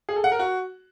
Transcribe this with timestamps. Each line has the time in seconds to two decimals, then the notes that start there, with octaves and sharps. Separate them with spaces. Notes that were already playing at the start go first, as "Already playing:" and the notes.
0.09 G#4
0.16 A4
0.24 F#5
0.32 A#4
0.39 F#4